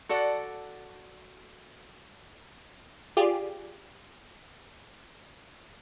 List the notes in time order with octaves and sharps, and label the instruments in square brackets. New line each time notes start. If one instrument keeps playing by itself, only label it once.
[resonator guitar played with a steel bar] F#4 A4 D5 F#5
[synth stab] F4 G4 G#4 D5